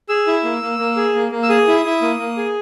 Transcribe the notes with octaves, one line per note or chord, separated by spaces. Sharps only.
G#4 E6
E4
A#3
A#3
A#3
G#4
A#3
A#3
E6
G#4 D#6
E4
E4
A#3
A#3
G#4